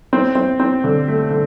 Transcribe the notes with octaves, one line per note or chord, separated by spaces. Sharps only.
C4
C4
C4
D3
A3
D3